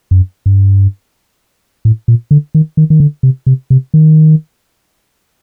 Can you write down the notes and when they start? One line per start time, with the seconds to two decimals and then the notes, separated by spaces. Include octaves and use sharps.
0.11 F#2
0.46 G2
1.85 A2
2.08 A#2
2.31 D3
2.55 D#3
2.77 D#3
2.90 D#3
3.00 D3
3.23 C3
3.46 C3
3.70 C3
3.94 D#3